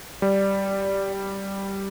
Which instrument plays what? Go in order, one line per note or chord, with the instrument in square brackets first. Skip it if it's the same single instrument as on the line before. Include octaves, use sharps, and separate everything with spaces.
[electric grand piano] G3 [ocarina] D5